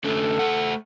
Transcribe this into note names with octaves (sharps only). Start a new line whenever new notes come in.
D3 A3 C#4 A4
A3 F#5